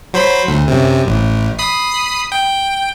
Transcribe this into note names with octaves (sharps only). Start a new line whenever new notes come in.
F#3 C5 B5
D2
F#2 C3
A1
B5 D#6 C7
G5